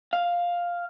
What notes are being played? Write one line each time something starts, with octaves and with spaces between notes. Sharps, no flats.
F5